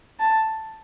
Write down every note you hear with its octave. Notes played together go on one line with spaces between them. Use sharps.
A5